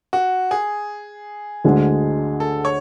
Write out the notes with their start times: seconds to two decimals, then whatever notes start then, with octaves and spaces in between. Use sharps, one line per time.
0.13 F#4
0.51 G#4
1.65 D2 D3 G#3
2.40 A4
2.65 C#5